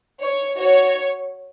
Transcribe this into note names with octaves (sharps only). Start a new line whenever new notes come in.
C#5
F#4 C#5